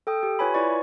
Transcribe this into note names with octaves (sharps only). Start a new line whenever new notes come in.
A4 G5 D#6
G4
F4 B4 C#5 G#5 B5
E4 F4 B4 C#5 D5 C#6